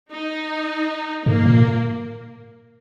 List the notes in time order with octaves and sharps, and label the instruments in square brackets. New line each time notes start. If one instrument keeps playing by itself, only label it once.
[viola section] D#4
[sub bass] G#2 [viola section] A#3
[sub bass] A#2